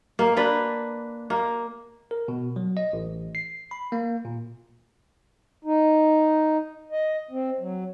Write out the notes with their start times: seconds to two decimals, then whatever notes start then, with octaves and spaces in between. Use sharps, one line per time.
0.19 A#3
0.37 A#3 D4 B4
1.30 A#3
2.11 A#4
2.28 B2
2.56 F#3
2.77 D#5
2.93 A1
3.35 C7
3.71 B5
3.92 A#3
4.25 A#2
5.64 D#4
6.92 D#5
7.31 C4
7.60 F#3